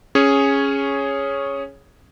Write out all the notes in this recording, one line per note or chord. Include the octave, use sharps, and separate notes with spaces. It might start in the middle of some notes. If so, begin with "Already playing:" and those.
C#4 G#4 C#5